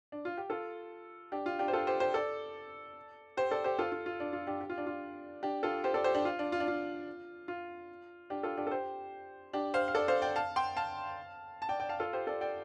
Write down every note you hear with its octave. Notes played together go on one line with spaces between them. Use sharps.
D4
F4
G4
F4 A4
D4 G4
F4
D4 G4
C5
F4 A4
G4 C5
G4 C5
A4 D5
G4 C5
A4 D5
G4 C5
F4 A4
F4
F4
D4
F4
D4 G4
G4
F4
D4
F4
D4 G4
F4 A4
G4 C5
A4 D5
G4 C5
D4 G4
F4
D4
F4
D4
F4
F4
D4 G4
F4 A4
D4 G4
A4
G4 C5
D4 G4
C5 F5
F5
A4 D5
C5 F5
D5 G5
F5 A5
G5 C6
F5 A5
A5
D5 G5
D5 G5
F5 A5
F4 A4
G4 C5
A4 D5
D5 G5